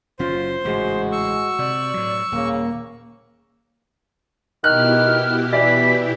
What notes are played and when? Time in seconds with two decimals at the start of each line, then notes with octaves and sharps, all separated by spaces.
0.19 F#1 F#3 C#4 F4 C5
0.65 A1 G#2 C#3 G#3 F#4
1.12 C#6 E6
1.59 C3 D5
1.94 A2 F#3
2.32 D#1 C#3 A#3
4.64 B2 D#3 E4 G4 F6 F#6
5.53 E3 D5 B6